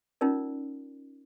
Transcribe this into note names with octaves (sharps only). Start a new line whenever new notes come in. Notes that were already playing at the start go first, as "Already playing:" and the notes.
C#4 D#4 F4 A#4 D5